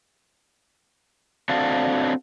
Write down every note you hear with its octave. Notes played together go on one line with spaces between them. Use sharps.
C4 D4 F#4 A4 F5